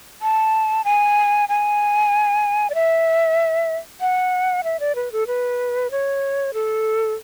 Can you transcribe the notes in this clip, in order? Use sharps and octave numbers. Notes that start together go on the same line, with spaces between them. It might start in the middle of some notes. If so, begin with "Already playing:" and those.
A5
G#5
G#5
D5
E5
F#5
E5
D5
B4
A4
B4
C#5
A4